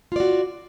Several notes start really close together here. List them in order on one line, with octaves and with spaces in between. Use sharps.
F4 D5 F#4